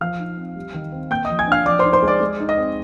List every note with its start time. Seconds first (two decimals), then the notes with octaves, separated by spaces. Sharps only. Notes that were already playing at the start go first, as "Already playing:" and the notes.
0.01 F3 F5 F6
0.19 D#4
0.37 C4
0.56 G3
0.74 D#3
0.92 C4
1.10 A#3 G5 G6
1.25 F3 D#5 D#6
1.39 G#5 G#6
1.47 D4 F5 F6
1.66 F3 D5 D6
1.79 D#4 C5 C6
1.93 C5 C6
2.02 G#3
2.08 D5 D6
2.20 G#3
2.40 D#4
2.49 D#5 D#6
2.57 C4